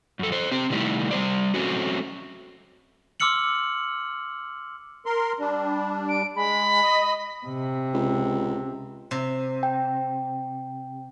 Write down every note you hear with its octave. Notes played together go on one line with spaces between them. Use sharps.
F#2 A4
A4 C5
C4 G4
C3 D#3 G3 A3 E4 G4
G3 C5 D5
F#3 A3 C4 C#4 F#4
C6 D6 E6 F6 C#7 F#7
A#4 C6
G3 D4
D7
G#3 B5
D#5
C3
C#2
C3
G5